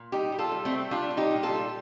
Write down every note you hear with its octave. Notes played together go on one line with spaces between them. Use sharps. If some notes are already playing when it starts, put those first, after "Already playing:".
Already playing: A#2
G3 D#4 G4
G3
F4 A4
G3
A3 C4
G3
G3 D4 F4
G3
D#4 G4
A#2
F4 A4
G3